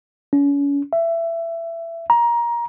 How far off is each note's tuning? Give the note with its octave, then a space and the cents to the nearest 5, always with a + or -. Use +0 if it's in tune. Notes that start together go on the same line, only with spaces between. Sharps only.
C#4 +35
E5 +20
A#5 +20